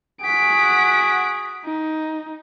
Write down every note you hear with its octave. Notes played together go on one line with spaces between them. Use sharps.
F#4 G#4 F#5 B6 D7
D#4